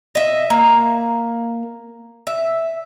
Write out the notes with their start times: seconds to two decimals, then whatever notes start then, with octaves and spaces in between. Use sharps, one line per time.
0.15 D#5 E5
0.50 A#3
2.27 E5